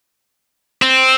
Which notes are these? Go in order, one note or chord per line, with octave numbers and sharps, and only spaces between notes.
C4